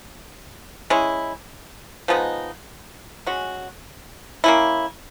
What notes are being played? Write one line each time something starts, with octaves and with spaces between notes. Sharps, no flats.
G#3 C#4 E4
F3 G#3 B3 D#4
G#3 C#4 F#4
A#3 C#4 E4